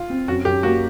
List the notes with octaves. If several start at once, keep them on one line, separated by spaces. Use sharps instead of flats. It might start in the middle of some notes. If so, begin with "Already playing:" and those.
Already playing: F4
C4
F#2 F#4
F#2 G4
A#3 F#4